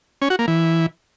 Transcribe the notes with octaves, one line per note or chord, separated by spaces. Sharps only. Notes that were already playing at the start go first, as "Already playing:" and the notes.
C#4
F#4
A#3
E3